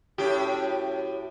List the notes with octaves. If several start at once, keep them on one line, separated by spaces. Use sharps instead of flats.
F#2 A2 G4